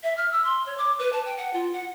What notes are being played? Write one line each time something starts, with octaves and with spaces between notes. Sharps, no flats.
E5
F6
E6
C6
C#5
D6
B4
A5
G5
F#5
F4
F#5